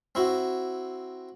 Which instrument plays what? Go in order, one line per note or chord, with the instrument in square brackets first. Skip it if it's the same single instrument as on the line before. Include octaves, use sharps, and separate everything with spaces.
[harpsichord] C4 E4 F#4